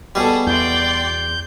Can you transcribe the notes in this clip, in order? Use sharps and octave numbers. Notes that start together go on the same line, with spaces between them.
B2 G3 G#4 A4
E2 D5 G5 C6 G6